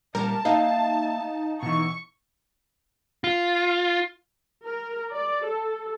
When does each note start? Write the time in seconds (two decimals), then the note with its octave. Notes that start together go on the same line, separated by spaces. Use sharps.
0.15 A#2 G3 A#4 A5
0.45 A#3 D#4 E5 F5
1.63 B2 E3 C#6
3.24 F4
4.64 A#4
5.12 D5
5.47 A4